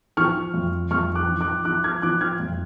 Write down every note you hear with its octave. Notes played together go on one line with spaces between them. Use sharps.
F3 C#6 F6
F2
F2 C#6 F6
D6 F#6
F3
D6 F#6
F3 D6 F#6
F6 G#6
F3 D6 F#6
F6 G#6
F2